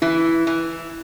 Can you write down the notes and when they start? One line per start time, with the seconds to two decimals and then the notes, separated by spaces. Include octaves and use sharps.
0.02 E3 E4
0.47 E3